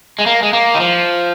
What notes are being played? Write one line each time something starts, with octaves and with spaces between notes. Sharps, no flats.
G#3
A#3
G#3
A#3
D#3
F3